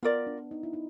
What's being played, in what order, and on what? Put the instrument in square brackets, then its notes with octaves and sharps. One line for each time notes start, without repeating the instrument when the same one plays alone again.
[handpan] B3 [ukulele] F4 A#4 D5
[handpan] D4
D#4
E4
D#4